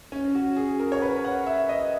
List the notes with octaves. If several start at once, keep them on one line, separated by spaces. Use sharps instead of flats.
C#4
F#4
G#4
A#4
C#5
B4
F#5
E5
D#5